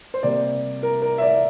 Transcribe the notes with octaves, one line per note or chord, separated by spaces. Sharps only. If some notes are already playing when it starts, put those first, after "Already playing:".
C5
C3 G3 A#3 D5
A#4
A#4
E5
D5